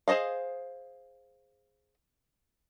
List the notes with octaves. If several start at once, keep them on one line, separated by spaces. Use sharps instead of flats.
G#4 C5 C#5 D#5 F5